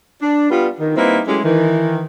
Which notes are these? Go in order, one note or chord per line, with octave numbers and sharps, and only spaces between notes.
D4
G3 B3 F4
D#3
G3 A#3 C4 D#4 E4 B4
F#3 G#3 A3 C#4 E4 G4
D#3 E3